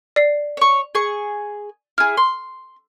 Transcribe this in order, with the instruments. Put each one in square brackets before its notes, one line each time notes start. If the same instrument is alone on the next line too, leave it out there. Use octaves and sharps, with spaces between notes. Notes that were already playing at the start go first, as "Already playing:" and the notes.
[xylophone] D5 C7
[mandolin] C#5 C#6
G#4 C#6
[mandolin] E4 G#4 [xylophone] F6
[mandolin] C6